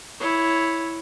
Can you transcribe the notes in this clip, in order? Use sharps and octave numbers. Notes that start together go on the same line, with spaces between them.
E4 C#5